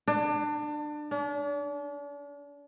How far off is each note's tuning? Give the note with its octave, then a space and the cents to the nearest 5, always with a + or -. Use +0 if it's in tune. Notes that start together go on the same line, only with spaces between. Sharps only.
D4 +25
D4 -40